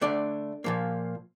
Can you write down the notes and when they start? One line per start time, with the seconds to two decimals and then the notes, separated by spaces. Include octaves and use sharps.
0.01 D3 A3 D4 D5
0.64 A#2 F3 A#3